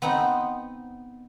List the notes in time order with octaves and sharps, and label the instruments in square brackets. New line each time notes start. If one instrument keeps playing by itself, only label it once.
[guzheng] B3 C4 D#4